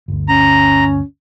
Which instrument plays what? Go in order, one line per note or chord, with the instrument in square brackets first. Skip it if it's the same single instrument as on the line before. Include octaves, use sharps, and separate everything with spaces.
[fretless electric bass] G1 D2
[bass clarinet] C#4 [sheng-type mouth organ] A#5